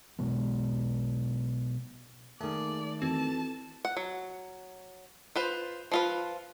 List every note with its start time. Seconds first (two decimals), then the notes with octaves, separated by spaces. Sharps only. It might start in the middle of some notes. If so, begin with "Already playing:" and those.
0.19 B2 F#3 G#3 B3
2.41 D#3 A3 A#3 G#4 D5 A5
3.02 E3 C4 F#4 A4 A5
3.85 F#5
3.97 F#3
5.36 F4 B4 C5
5.92 F3 F4 B4